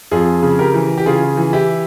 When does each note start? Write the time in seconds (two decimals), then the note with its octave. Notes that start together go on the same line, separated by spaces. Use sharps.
0.11 F2 F4 G#4
0.42 C#3
0.59 G4 A#4
0.74 E3
0.98 G4
1.06 C#3 F4 G#4
1.37 E3
1.53 E4 G4